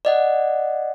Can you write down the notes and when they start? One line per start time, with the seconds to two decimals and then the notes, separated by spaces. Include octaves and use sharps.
0.05 D5 D#5 F#5